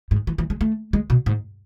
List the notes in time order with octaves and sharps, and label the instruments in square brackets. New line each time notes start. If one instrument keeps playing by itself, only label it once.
[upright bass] G#2
E3
E3
G#3
A3
G#3
B2
G#2